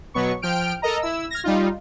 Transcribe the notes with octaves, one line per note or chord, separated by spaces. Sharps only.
B2 F#3 B3 B4 C#6
F3 G5 F6 D7
A4 A#4 D#5 A#5
E4 E6
F6 G#6 A#6
G3 D#4 F4